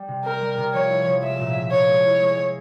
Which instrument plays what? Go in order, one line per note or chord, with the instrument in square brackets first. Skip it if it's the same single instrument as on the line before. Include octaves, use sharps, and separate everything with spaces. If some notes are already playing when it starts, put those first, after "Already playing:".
Already playing: [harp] G3
C3
[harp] C4 [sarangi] A#4
[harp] G3
C3
[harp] F3 [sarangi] C#5
[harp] E4
F3
[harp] G#3 [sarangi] E5
[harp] A#2
A#2
[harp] A#2 [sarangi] C#5
[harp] G#3
E4
G#3
G#3